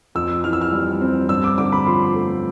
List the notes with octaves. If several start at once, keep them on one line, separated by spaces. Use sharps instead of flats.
F2 E6
E3 F6
E6
F6
G3
C4
G2 E6
D6
D3 D6
B5
F3 C6
A3